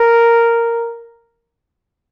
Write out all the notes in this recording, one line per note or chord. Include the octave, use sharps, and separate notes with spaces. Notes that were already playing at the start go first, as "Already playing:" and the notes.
Already playing: A#4